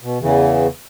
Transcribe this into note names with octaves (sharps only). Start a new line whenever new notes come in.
B2
E2 C#3 E3